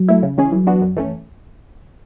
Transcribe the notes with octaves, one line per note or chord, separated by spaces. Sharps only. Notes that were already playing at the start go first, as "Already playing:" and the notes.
Already playing: F#3
A3 E4
C#3
E3 G#3 C#4 G#4
E3 F#3
B3 D4 F#4
F#2
E3 A3 C#4